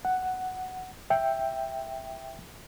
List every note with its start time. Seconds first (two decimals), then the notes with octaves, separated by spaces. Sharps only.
0.05 F#5
1.10 E5 G5